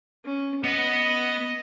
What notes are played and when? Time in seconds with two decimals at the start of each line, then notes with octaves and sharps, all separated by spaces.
0.25 C#4
0.64 B3 D#5 F#5